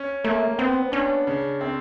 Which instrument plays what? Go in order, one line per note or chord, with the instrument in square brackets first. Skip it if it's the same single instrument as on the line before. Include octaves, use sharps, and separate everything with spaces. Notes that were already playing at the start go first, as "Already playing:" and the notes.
Already playing: [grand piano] C#4
[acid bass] A3 [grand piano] A#3
[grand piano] B3 [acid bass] C4
[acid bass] C#4 [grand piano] D4
[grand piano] C#3
C4